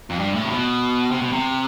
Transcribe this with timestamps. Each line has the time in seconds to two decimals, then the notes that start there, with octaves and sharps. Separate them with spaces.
0.10 F2
0.19 G2
0.35 A2
0.45 C3
0.50 B2
1.11 C3
1.21 B2
1.32 C3